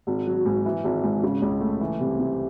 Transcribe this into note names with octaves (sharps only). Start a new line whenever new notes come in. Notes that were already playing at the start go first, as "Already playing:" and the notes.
G#1
F#3
G#2
E3
G#1
G#2
C#3
C#2
A3
E3
C2
C3